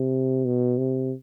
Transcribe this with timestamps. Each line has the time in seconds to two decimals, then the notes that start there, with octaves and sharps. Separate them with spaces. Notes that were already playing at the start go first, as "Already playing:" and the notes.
Already playing: C3
0.45 B2
0.78 C3